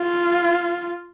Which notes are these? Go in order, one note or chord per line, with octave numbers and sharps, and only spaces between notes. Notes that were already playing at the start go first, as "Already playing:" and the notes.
Already playing: F4